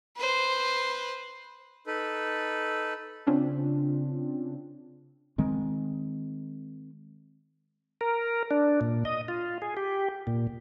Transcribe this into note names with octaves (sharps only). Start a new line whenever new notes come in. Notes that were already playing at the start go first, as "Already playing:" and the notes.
B4 C5
D#4 A4 B4
C#3 C4 D4 F4
D#3 G#3 C4
A#4
D4
A#2
D#5
F4
G#4
G4
A#2